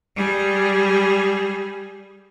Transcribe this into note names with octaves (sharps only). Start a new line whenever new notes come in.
G3 G#4